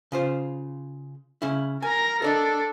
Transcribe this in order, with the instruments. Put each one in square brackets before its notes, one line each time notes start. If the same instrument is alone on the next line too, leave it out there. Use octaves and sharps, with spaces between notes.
[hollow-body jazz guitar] C#3 F4 C5
C#3 C#4 E4
[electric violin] A#4 A#5 [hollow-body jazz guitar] G#5
[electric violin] D4 A4 [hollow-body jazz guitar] A#4 D5 D#5